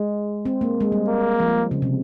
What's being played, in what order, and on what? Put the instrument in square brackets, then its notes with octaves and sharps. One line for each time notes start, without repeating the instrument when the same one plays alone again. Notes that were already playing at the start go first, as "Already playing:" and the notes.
Already playing: [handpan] G#3
C4
A#3
G#3
G3
[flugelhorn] A#3
[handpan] F3
C#3
C3